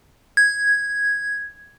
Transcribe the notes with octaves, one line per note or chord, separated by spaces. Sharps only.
G#6